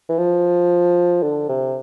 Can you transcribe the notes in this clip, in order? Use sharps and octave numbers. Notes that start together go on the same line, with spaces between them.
E3
F3
D3
C3